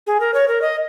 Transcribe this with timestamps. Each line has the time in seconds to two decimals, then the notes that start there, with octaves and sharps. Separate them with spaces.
0.07 G#4
0.20 A#4
0.34 C#5
0.48 A#4
0.62 D#5